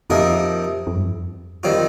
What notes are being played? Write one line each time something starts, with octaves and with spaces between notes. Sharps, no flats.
F2 C3 F3 A#3 D#4 A#4
F2
G2
F2
D#3 G3 C4 F4